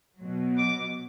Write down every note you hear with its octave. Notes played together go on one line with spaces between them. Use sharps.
B2 F#3
D6